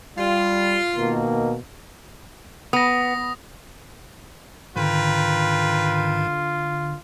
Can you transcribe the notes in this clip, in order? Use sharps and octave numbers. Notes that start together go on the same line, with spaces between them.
G3 F4
B2 D#3 A#3
B3 D#6 A#6
G#2 D3 D#3 F4 B4 G5 A#5